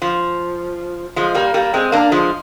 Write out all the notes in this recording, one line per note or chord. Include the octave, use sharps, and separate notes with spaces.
F3
F3 G#3
G3 A#3
G3 A#3
G#3 C4
A#3 D4
F3 G#3